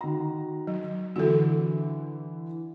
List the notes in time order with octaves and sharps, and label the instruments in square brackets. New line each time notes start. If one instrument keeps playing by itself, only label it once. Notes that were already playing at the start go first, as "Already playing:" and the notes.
[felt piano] D#3 F#4 A#5
[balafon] F#3
[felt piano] D3 E3 [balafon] F#4 A4